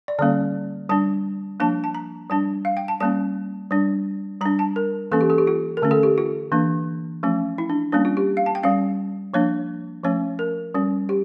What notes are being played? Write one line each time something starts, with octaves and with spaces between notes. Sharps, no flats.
D5
D3 G3 A#3 C#4 D5
G3 D4 A5
F3 A#3 D4 A5
A5
A#5
G3 D4 A5
F5
G5
A5
G3 A#3 C#4 A5
G3 D4
G3 D4 A#5
A5
A#4
E3 A#3 C#4 A4
G4
A4
G4
F4
A#4
D3 A3 C#4
A4
G4
F4
E3 A#3 D4
F3 A3 C#4
E4
D4
G3 A#3 C#4 D4
F4
G4
F5
A5
G5
G3 C#4 F5
F3 A#3 D4 C#5
F3 A3 C#4 C#5
A#4
G3 C#4
G4